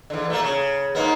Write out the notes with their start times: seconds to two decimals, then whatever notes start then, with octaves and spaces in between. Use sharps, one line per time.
0.10 E2 D3
0.30 A3 A#3
0.43 C#3
0.95 G#2 A#3 B3